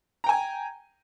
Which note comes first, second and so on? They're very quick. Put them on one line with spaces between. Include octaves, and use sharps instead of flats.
A#5 G5 G#5